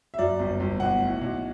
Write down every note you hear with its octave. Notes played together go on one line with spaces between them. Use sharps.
E5
F#2 D5
G1
G1
B1 F#5
A2
B1